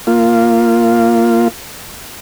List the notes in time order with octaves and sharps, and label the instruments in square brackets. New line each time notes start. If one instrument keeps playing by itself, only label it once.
[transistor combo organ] A#3 F4